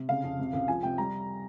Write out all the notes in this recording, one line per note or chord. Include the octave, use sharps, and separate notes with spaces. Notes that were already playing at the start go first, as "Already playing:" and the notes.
Already playing: C3
C#3 F5
F2
C3
C#2
F3 G#5
C3 G5
G3 A#5